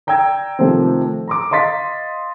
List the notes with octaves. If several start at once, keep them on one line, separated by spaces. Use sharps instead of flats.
D5 G5 A#5 E6 G#6
C3 D#3 F3 A3 C4
A#5 C6 D6
D#5 F5 C6 A6 B6